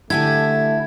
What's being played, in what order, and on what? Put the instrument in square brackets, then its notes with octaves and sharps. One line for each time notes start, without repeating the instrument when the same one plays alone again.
[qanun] D3 G4 G#5 [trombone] A3 [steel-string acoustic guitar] E4 [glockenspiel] G#6